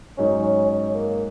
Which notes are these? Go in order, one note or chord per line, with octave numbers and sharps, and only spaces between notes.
G#2 F#3 C#4 D#4 G#4 C#5
C#4
C#4
A#3